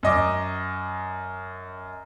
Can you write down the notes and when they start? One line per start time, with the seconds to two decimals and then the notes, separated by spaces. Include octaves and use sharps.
0.03 F#2 D#5 D6